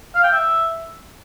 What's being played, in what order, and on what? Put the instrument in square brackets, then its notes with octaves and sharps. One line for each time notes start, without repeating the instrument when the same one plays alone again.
[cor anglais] F5
G5
E5